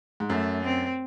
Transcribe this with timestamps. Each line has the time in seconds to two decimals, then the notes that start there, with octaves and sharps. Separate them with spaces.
0.20 G#2
0.30 F#2 A3
0.64 C4